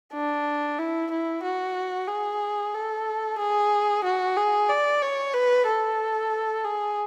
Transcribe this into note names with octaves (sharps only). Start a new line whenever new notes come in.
D4
E4
E4
F#4
G#4
A4
G#4
F#4
G#4
D5
C#5
B4
A4
G#4